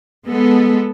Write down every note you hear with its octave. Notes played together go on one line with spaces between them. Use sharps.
G#3 B3 A4